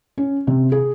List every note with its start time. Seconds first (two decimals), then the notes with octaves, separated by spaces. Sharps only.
0.18 C#4
0.47 C3
0.72 G#4